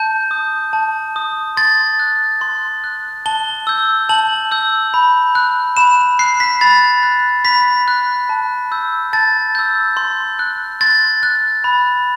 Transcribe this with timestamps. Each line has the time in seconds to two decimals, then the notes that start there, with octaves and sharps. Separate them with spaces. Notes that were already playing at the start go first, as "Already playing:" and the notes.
Already playing: A5 G6
0.31 D#6 G6
0.73 A5
1.16 D#6 G6
1.57 C6 A6
2.00 F#6
2.41 C6
2.84 F#6
3.26 A5 G7
3.67 E6 G6
4.09 A5 F#7
4.51 E6 G6
4.94 B5
5.35 F#6
5.77 B5 E7
6.19 F#6 C7
6.40 B6
6.61 B5 A6
7.03 F#6
7.45 B5 B6
7.88 F#6
8.29 A5
8.72 E6 G6
9.13 A5 A6
9.55 E6 G6
9.97 C6
10.39 F#6
10.81 C6 A6
11.23 F#6
11.64 B5